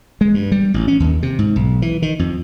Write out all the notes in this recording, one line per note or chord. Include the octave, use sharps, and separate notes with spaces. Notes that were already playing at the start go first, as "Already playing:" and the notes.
G#3
G2
G3
A1
C#4
D#2
C3
G#2
B1
E3
D#3
F2